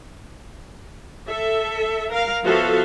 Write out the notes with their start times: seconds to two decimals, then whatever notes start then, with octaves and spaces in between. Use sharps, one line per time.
1.28 A4 E5
2.10 A#4 F5
2.44 F3 B3 F#4 A4 E5 F5